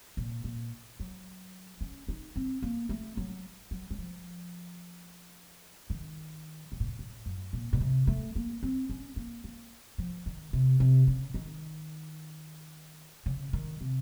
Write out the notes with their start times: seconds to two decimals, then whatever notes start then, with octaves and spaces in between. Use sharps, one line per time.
0.17 A#2
0.44 A#2
1.00 F#3
1.81 C#4
2.08 D#4
2.36 C4
2.62 A#3
2.89 A3
3.17 F#3
3.71 F#3
3.91 F#3
3.98 F3
5.90 D#3
6.72 A2
6.80 A#2
6.88 A2
6.99 A2
7.26 F#2
7.53 A#2
7.73 A#2
7.80 C3
8.07 A3
8.36 A#3
8.63 C4
8.90 C#4
9.16 A#3
9.44 A#3
9.98 F3
10.26 D#3
10.53 C3
10.80 C3
11.08 C#3
11.34 D#3
13.26 C#3
13.53 D#3
13.81 C3